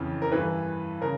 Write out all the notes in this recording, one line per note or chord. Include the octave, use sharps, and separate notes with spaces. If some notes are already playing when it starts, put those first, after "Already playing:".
Already playing: F2 C#3 E3
A#4
G2 E3 B4
C#3 A#4